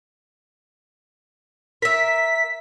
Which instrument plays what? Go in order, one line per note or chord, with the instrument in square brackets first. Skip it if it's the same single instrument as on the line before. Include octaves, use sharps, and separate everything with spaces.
[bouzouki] A#4 E5 [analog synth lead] B6